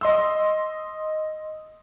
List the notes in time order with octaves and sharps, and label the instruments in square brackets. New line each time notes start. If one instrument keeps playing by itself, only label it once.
[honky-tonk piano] D#5 C6 E6